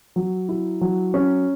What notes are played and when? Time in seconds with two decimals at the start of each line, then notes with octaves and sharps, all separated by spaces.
0.16 F#3
0.49 E4
0.81 F#3
1.14 C#4